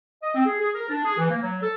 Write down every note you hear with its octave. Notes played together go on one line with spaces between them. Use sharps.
D#5
C4
G#4
G#4
A#4
D4
G#4
E3
A#3
F#3
A4